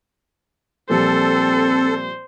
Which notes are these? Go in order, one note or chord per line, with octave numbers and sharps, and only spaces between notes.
A#2 F3 G3 C4 A4 C5